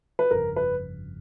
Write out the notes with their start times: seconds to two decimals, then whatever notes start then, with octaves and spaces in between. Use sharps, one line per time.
0.19 B4
0.31 G1 F2 C#3 A#4
0.56 B4